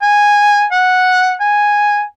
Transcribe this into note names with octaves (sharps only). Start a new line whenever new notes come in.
G#5
F#5
G#5